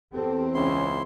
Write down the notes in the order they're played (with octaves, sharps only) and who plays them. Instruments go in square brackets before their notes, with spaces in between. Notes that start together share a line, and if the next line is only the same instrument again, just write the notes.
[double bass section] E2 C4 [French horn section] G4 A4
[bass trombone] C#2 [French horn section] C#4 [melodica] E4 C6